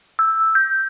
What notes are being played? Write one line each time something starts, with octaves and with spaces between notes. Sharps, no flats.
E6
G6